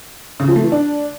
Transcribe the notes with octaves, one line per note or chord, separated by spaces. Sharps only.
C#3
F3
A3
E3
D4